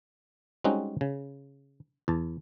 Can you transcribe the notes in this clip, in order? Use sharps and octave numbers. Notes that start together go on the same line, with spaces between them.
G3 G#3 C4 C#4 D#4 F#4
C#3
E2 A5